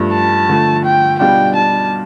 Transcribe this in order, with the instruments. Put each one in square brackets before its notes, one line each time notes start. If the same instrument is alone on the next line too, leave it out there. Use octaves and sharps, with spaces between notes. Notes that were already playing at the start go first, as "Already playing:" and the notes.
Already playing: [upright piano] G2 F3 A3
[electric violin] A5
[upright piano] D3 F3 A3
[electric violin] G5
[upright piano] B2 G3 D4 F4 [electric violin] G5
[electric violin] A5